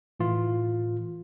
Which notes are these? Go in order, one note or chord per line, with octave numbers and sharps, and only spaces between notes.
A2 E3 F4